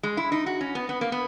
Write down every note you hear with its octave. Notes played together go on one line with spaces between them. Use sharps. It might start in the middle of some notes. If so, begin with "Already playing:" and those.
G#3
E4
D#4
F#4
C#4
B3
B3
A#3
B3